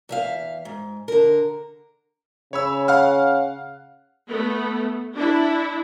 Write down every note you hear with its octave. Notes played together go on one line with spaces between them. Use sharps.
E2 E5 F5
G#2
D3 A#4
C#3 C#5 B5 E6
F5 F#5 F6
A3 B3
D4 E4